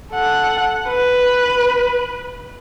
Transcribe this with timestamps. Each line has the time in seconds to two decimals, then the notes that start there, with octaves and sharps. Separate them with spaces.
0.12 A4 F#5
0.89 B4